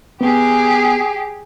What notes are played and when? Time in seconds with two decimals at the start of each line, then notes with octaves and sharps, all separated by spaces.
0.21 B3 G4 G#4